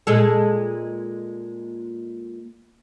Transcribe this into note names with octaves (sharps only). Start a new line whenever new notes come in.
A#2 G#3 A4